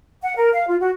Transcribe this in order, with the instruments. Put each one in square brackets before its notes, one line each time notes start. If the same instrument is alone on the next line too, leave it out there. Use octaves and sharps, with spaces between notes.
[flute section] F#5
A#4
F5
F4
F#4